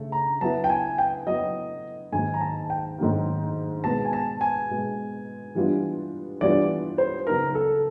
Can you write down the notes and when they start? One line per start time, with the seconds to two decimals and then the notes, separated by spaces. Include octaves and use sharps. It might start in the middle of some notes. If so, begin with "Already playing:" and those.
Already playing: C#3 A3
0.12 A#5
0.41 F#3 B3 E4 A5
0.64 G5
0.69 G#5
0.98 G5
1.26 F#3 B3 E4 D#5
2.12 G#2 D#3 F#3 A#3 G#5
2.34 A#5
2.41 A5
2.70 G5
2.98 G#2 D#3 F#3 A#3
3.84 B2 G#3 B3 A5
4.05 G#5
4.13 A5
4.41 G#5
4.70 B2 G#3 B3
5.55 E3 G3 B3 D4 F4
6.41 E3 G3 B3 D4 F4 D5
6.98 C5
7.27 C#3 F#3 B3 D#4 A#4
7.55 A4